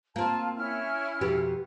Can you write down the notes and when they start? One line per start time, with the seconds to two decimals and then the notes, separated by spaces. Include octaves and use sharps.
0.16 A#3 C4 F4 A5
0.56 C#4 E4 F6
1.21 F2 B2 G4